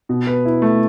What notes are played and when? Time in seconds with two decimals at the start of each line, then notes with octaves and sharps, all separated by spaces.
0.09 B2
0.27 B4
0.45 E4
0.62 A3